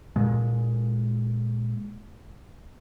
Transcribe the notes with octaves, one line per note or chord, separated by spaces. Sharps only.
A#2 G#3